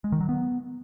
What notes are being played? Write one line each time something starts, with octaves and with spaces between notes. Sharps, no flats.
G#3
D#3
F#3
B3